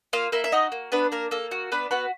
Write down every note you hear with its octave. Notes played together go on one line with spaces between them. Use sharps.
A#3 F4 F5
A#3 E4 E5
E5
D#4 F#4 D#5
A#3
B3 D4 B4
A#3 A#4
A#3 A4
F#4
B3 D4 B4
B3 F#4 B4